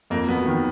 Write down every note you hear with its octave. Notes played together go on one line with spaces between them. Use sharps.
F2 A#3
F#3 B3
D#3